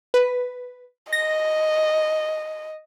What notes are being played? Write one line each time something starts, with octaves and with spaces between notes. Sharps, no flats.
B4
D#5 A#6